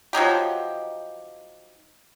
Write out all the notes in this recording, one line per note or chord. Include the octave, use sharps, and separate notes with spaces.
F3 F#3 D#4 G4